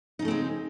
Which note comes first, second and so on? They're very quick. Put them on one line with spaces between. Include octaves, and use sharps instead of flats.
D#4 C#3 A3 C4 G#3